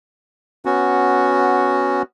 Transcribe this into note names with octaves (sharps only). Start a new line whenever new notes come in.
B3 C#4 F#4